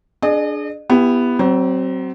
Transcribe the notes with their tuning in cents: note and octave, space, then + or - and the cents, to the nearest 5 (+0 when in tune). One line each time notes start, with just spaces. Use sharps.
D4 +0 G#4 +20 D#5 -45
B3 +0 E4 +30 G4 +20
F#3 +35 C4 +0